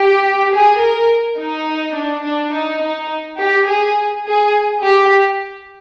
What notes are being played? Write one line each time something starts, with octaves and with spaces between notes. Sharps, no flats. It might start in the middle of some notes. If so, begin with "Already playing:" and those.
Already playing: G4
G#4
A#4
D#4
D4
D4
D#4
D#4
G4
G#4
G#4
G4